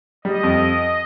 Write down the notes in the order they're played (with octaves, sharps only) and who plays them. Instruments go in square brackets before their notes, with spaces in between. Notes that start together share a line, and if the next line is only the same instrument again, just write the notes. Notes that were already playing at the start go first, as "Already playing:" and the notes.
[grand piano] G3 [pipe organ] D#5
[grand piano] F2